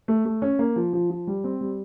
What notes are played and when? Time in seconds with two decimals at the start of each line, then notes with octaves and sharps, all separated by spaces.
0.08 A3
0.25 A3
0.42 C#4
0.59 A#3
0.76 F3
0.93 F3
1.10 F3
1.27 G3
1.44 C4
1.61 G3